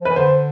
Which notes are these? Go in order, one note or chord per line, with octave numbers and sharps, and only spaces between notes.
F3
E3 B4
D3 C5